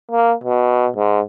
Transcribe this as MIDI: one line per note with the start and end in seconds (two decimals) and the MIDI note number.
0.12 0.33 58
0.44 0.89 47
0.96 1.21 44